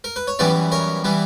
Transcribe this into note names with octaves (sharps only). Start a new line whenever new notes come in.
A#4
B4
C#5
F#2 E3 G3 B3 B4 D5
A#4 C#5
E3 G3 B3